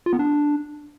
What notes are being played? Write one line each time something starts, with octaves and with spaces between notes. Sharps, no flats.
F4
B3
D4